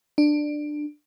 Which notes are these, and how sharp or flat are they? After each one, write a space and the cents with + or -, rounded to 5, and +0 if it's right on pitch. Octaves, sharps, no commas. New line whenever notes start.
D4 +15